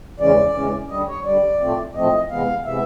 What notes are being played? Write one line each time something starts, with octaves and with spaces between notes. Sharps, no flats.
E2 C#3 E3 G#3 C#4 D5
E2 C#3 E3 G#3 C#4
D2 D3 G3 D#5
C#5
D2 D3 G3 D5
A2 F3 A3 C4
A2 F3 A3 C4 D#5
C3 E3 G#3 B3 F5
C3 E3 G#3 B3 E5